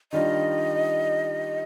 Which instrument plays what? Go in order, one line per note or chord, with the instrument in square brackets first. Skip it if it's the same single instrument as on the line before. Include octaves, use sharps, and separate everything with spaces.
[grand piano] D#3 G3 D4 F4 [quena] D#5